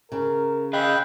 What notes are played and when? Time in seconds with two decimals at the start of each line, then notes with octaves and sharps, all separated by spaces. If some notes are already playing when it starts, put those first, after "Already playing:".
0.12 C#3 A#4
0.73 G#4 D#5 F5 G5 B5 F#6